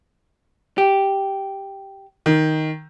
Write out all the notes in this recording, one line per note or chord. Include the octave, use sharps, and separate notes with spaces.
G4
D#3